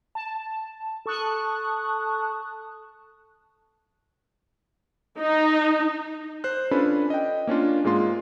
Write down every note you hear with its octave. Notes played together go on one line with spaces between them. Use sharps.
A5
A4 A5 C#6 D#6 F#6
D#4
C5 F#6
C#4 D4 F4 A4 B4 B5
D#5 G5
A#3 C#4 D4 F4
G#2 G#3 A#3 F4 C6